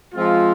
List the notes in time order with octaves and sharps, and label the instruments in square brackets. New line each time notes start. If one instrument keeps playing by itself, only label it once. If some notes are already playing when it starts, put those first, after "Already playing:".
[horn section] F3 G#3 C4 F4